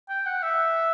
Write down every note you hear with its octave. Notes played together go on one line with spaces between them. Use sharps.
G5
F#5
E5